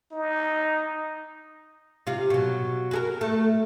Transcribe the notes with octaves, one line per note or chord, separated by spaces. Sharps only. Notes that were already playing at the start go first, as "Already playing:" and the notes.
D#4
C3 F4
B2 F#3
F#4 G#4 A#4
A3